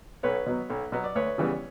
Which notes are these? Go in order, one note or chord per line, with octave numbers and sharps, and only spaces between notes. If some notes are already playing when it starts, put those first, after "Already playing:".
B1 B4 C#5
B2 F#3 B3
B1
B2 F#3 B3
D5
D2 B4 C#5
C#3 E3 G3 B3